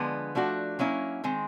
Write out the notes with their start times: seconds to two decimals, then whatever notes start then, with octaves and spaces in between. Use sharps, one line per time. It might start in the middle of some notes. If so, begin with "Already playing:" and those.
Already playing: D3 F3 G#3 B3
0.35 F3 A3 D4 F#4
0.79 F#3 A#3 C#4 E4
1.24 D#3 G#3 C4